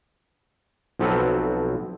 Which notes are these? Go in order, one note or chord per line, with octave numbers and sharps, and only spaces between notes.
B1 F3 F#3 C4 A4 B4